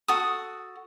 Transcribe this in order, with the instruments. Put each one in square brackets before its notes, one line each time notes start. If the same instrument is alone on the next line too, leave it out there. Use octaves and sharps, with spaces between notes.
[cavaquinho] F#4 A4 D#6